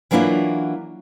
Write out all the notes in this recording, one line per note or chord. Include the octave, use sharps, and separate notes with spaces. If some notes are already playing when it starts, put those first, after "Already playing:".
E3 F#3 A#3 D4 E4 F4